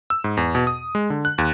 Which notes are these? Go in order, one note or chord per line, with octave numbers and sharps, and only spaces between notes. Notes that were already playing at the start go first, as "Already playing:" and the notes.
E6
G#2
E2
B2
D#6
G#3
D3
F#6
D#2